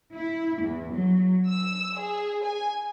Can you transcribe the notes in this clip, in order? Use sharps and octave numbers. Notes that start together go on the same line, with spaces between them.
E4
E2
F#3
E6
G#4
G#5